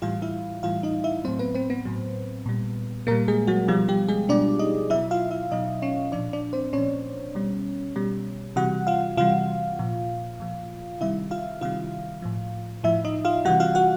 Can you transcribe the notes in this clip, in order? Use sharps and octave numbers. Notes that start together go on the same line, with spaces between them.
A2 E3 G3 F4 F5
E4 E5
A2 E3 G3 F4 F5
D#4 D#5
E4 E5
A2 F#3 C4 C5
B3 B4
C4 C5
B3 B4
A2 F#3
A#2 G3
A#2 G3 A#3 A#4
G#3 G#4
F#3 F#4
B2 F3 G3 F4
G3 G4
G#3 G#4
B2 G3 D4 D5
D#4 D#5
B2 F#3 E4 E5
F4 F5
E4 E5
B2 F#3 D#4 D#5
C#4 C#5
A#2 F3 D4 D5
D4 D5
C4 C5
A#2 F3 C#4 C#5
B2 G3
B2 G3
C3 E3 G3 F#4 F#5
F4 F5
C3 E3 G3 F4 F5
A#2 F3
A#2 F3
C3 D#3 G3 E4 E5
F4 F5
C3 D#3 G3 F4 F5
A2 F3
A2 F3 E4 E5
D#4 D#5
F4 F5
C3 E3 G3 F#4 F#5
F4 F5
F#4 F#5